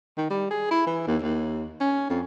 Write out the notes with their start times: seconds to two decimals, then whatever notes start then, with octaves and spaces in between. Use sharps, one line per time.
0.17 D#3
0.30 G3
0.51 G#4
0.71 E4
0.87 E3
1.07 D#2
1.22 D#2
1.80 C#4
2.10 F2